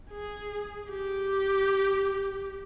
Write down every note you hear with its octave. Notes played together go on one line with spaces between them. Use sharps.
G#4
G4